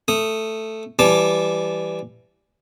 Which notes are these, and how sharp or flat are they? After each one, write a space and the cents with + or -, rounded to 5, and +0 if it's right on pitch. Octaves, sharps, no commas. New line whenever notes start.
A3 +5 D#6 -5
E3 +10 G3 +0 A5 -15